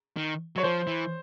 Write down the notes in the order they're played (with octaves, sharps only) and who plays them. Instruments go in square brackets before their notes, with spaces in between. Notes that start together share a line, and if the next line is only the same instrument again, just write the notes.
[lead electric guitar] D#3
[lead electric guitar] F#3 [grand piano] C#5
[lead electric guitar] F3 [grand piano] C5
[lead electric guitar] E3